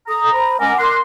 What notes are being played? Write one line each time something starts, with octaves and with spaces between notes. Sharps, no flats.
A4 A#5 D#6
C5 B5
G#3 C#4 A#4 F#5 G#5 D6
A#4 C6 D6 F#6